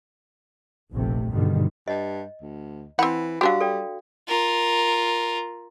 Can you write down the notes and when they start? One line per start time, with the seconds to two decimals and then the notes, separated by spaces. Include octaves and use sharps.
0.93 F1 A#1 C3 A3
1.31 G2 B2 D3 D#3 G3
1.88 G2 D#5
2.42 D2
2.99 E3 C4 F#5 B5
3.41 F#3 G3 D4 F#4 G4 F5
3.60 A4 D5 G5
4.28 F4 A#4